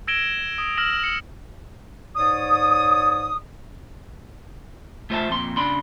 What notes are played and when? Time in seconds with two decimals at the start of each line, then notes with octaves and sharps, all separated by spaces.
0.07 E6 G#6 A#6 D7 E7 G7
0.58 D#6
0.77 E6 F6 A#6 D7 E7 F#7
1.04 C#7
2.16 G#2 C#5 D5 D#6
5.10 A3 F4 C5 D#5 E5 A5
5.28 F2 A#2 C6
5.57 C#3 D4 B5 C6